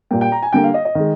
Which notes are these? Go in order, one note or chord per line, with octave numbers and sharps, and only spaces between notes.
A#2 G3 A#3 G5
G5
A#5
G#5
D3 G3 A#3 G5
F5
D#5
D#5
D#3 G#3